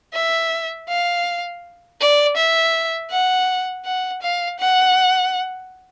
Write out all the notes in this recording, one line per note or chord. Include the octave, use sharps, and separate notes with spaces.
E5
F5
D5
E5
F#5
F#5
F5
F#5